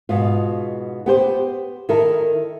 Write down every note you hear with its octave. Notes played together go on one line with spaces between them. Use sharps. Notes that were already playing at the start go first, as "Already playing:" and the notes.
G#2 B2 F4
B3 G4 C5
D#3 E4 A4 A#4